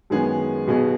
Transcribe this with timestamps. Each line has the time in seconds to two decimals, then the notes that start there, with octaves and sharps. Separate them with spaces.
0.10 F#2 D#3 G#3 B3 G#4
0.67 B1 B2 B3 G#4